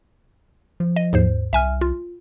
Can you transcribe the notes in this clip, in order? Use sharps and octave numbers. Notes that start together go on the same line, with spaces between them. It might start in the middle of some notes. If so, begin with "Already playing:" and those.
F3
D#5
D#2 G#2 C5
C2 E5 G#5 F6
F4